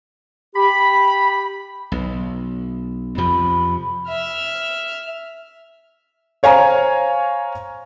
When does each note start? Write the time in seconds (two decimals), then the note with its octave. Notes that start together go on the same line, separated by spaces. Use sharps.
0.56 G4 B5
1.92 B1
3.18 F2 C3 F3 B5
4.08 E5 F6
6.43 C5 C#5 F5 G#5 A#5